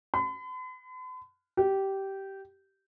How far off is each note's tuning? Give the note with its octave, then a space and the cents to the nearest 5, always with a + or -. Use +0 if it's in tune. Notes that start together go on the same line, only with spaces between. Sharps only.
B5 +45
G4 -15